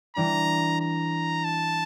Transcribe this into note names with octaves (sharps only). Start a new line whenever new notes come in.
E3 G3 D4 A#5
A#5
A5